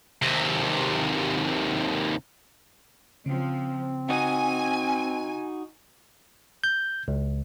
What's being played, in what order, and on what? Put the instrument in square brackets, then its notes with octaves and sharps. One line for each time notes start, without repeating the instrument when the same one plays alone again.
[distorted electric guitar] D#2 C3
[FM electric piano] C#3 [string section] F3 [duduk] C4
[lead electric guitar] D#4 F#4 [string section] G#5
[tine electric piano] G6
C#2